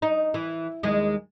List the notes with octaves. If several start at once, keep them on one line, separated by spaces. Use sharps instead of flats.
D#4
E3
D#2 G#3